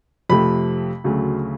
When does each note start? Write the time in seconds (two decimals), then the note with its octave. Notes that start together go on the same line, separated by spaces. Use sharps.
0.29 F2 C3 F3 A3 B5
1.04 D2 C#3 F#3 A3